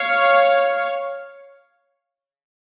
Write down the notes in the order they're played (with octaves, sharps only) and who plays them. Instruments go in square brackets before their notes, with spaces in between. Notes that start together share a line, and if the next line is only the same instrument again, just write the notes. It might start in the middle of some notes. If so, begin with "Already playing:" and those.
Already playing: [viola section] C#5 F5